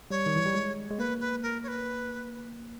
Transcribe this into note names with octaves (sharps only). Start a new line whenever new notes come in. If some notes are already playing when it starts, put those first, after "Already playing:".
G3 C#5
D#3
E3
G3
G#3
G#3
A#3 B4
B4
A#4
C#5
B4